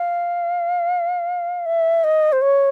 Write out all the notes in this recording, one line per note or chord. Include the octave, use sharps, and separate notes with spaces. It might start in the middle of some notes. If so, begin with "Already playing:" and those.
Already playing: F5
E5
D#5
C5
C#5